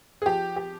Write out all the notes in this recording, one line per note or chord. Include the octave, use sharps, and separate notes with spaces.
G#4
F3 G4
G4